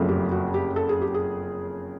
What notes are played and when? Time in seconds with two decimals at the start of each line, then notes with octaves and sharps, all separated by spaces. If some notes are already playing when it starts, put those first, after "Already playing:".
Already playing: F#1 F2 C#3 F#3 A3
0.09 G4
0.31 F#4
0.54 G4
0.76 A4
0.89 G#4
1.01 G4
1.14 G#4